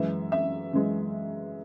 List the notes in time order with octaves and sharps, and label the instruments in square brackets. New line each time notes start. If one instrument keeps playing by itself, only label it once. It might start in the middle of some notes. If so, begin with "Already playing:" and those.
Already playing: [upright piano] F#2 E3 G#3 E5
E5
F#2 E3 G#3